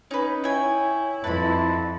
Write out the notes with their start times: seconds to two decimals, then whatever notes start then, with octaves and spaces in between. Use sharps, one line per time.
0.11 C#4 D#4 B4
0.44 E4 C#5 G5 G#5
1.24 F2 B4 A5 B5